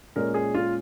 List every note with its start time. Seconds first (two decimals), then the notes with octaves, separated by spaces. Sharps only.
0.16 A#2 G#3 C#4 A#4
0.34 G#4
0.54 F4